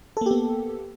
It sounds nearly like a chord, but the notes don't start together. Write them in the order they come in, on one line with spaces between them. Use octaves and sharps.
A4 A#3 G4 B3